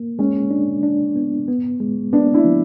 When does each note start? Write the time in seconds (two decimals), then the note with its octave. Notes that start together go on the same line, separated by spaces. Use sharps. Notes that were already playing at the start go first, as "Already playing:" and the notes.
Already playing: A#3
0.19 G#3 C#4
0.51 D4
0.83 D4
1.16 B3
1.48 B3
1.80 G#3
2.13 B3 D4
2.34 D4 E4
2.45 F3